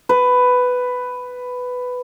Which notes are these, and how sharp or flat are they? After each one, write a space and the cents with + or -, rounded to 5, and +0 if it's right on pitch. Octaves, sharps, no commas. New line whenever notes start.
B4 +10